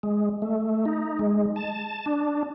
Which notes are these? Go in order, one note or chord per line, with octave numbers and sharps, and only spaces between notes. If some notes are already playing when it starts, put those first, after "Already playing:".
G#3
A3
D#4
G#3
A5
D4